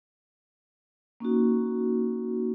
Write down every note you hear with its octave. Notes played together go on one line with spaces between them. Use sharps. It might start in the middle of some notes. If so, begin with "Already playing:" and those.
A#3 C#4 D#4 F#4